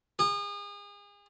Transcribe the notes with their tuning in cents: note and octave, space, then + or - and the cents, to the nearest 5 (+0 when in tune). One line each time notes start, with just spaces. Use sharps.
G#4 -35